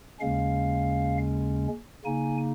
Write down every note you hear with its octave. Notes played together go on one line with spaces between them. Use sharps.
D#2 C#3 G#3 C#4 F5
C#3 A#3 D#4 G#5